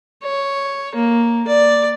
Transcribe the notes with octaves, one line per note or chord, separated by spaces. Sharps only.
C#5
A#3
D5